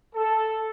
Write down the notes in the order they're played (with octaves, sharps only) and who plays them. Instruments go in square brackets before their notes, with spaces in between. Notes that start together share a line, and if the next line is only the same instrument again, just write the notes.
[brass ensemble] A4